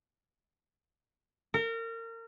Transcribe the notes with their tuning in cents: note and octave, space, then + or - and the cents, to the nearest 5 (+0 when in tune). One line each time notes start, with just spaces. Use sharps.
A#4 -30